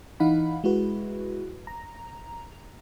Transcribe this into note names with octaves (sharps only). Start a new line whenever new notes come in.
E3 D#4 F5 F#5 B5
G#3 E4 F#4 B4
A#5